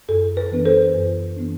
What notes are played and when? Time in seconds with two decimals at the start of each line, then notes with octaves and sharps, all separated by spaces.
0.09 F#2 A4
0.37 B4
0.51 E3 B3 D4
0.65 A4 C5
0.94 F#2
1.36 E3 B3 D4